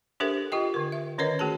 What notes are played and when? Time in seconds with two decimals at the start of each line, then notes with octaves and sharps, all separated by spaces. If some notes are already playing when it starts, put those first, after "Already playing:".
0.20 D4 G4 A4 A#4 C5 E5
0.52 F4 G4 D#5 G5
0.74 D3 A#4
0.92 E5
1.18 D#3 C#4 A#4 B4 C#5 D#5
1.39 A3 F#4 G#4 A5